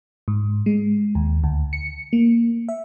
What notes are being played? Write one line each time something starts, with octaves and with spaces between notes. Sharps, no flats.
G#2
G#3
D#2
D2
C#7
A#3
E5